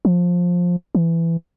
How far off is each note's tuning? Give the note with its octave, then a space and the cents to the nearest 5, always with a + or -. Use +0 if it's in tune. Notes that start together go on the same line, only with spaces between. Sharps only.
F3 +15
E3 +15